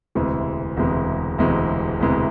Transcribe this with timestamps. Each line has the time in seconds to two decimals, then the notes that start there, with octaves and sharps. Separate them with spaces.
0.15 E1 D2 C3 E3 G#3
0.77 E1 D2 C3 E3 G#3
1.38 E1 D2 C3 E3 G#3
2.00 E1 D2 C3 E3 G#3